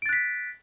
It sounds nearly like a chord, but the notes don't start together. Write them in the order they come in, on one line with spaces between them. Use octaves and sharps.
D7 A6 F#6 B6